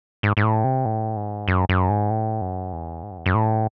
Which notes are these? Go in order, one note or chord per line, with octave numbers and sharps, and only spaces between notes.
G#2
G#2
A2
C3
A2
G#2
F#2
F#2
G#2
A2
F#2
E2
G#2
F#2
E2
F#2
A2